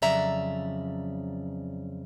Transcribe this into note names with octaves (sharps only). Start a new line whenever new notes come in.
F2 C#3 F#3 D5 E5 A#5